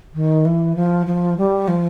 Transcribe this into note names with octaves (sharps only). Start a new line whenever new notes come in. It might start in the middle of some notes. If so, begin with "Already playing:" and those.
D#3
E3
F3
F3
G3
F3